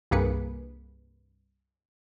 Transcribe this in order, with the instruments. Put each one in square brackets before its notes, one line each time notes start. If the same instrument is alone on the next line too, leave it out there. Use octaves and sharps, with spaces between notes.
[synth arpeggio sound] C2 G2 A#3 G#4 B4 C#7